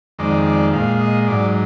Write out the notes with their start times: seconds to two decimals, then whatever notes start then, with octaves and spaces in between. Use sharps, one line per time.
0.19 F2 D#3 G#3 D5
0.47 D5
0.73 A#2 G#3 F5
1.00 D#5
1.28 G#2 F#3 D5